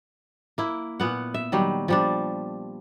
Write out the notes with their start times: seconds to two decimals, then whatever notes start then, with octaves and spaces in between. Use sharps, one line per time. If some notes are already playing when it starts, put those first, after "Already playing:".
0.58 A#3 E4
1.00 A#2 B3 F#5
1.34 E5
1.52 D#3 F#3 G3
1.88 F3 G3 D4